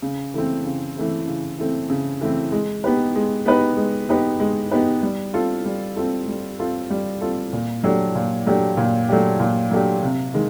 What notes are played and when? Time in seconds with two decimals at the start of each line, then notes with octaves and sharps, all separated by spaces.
0.02 C#3
0.34 E3 A3 C4
0.65 C#3
0.96 E3 A3 C4
1.27 C#3
1.58 E3 A3 C4
1.90 C#3
2.21 E3 A3 C4
2.52 G#3
2.84 B3 D#4 G4 B4
3.16 G#3
3.46 B3 D#4 G4 B4
3.77 G#3
4.09 B3 D#4 G4 B4
4.40 G#3
4.71 B3 D#4 G4 B4
5.03 G3
5.34 C4 F4 A4
5.65 G3
5.96 C4 F4 A4
6.28 G3
6.59 C4 F4 A4
6.90 G3
7.21 C4 F4 A4
7.53 A#2
7.84 F#3 A3 D4 G4
8.15 A#2
8.46 F#3 A3 D4 G4
8.77 A#2
9.09 F#3 A3 D4 G4
9.40 A#2
9.71 F#3 A3 D4 G4
10.02 C3
10.34 D#3 G#3